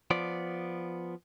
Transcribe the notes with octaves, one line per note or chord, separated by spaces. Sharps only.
F3 B3 D5